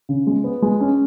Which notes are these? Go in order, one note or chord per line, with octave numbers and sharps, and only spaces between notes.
C#3
G#3
B3
G#3
C#4